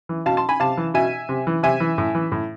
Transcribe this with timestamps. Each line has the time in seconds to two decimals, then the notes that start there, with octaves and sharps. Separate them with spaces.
0.09 E3
0.26 B2 F5 A5
0.37 A5 C6
0.49 G#5 B5
0.60 C3 F5 A5
0.77 E3
0.94 B2 E5 G#5
1.29 C3
1.47 E3
1.63 C3 E5 G#5
1.80 E3
1.98 A2
2.15 E3
2.32 A2